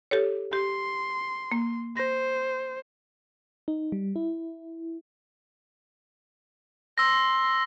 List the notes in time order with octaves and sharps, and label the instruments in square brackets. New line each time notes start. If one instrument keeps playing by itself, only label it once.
[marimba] G4 A4 C#5
[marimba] G4 [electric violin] C6
[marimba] A#3
[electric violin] C5 [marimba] A#6
[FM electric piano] D#4
G3
E4
[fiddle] C6 [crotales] E6 A#6